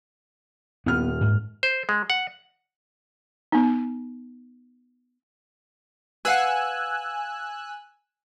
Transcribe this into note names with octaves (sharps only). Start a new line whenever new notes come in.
D#1 B3 F6
G#2
C5
G#3
F#5
B3 D#4
B4 F5 F#5 G#5 E6 F#6